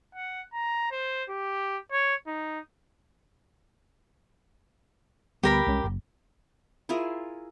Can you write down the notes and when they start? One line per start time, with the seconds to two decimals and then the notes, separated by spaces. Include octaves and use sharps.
0.15 F#5
0.53 A#5
0.91 C5
1.29 G4
1.92 C#5
2.27 D#4
5.43 D2 G3 B3 G4 A#4 B5
5.66 C2 G#3 C#4
5.84 F#1
6.89 E4 F4 G#4 A#4